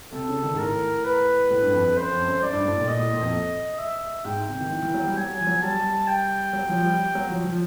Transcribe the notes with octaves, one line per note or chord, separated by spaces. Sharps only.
C3 A4
C#3
D#3
G#2
A2 A#4
B4
A2
G2
F2
F2
F#2 C5
F2
F#2
F#2 D5
G2
A2
A#2
A#2 D#5
A2
A#2
F2
E5
G#2 G5
C3
D#3
E3
E3
F#3
G3
F#3 G#5
F3
F#3
G3 A5
G3
G5
F#3
F3
G3
F#3
F3
F3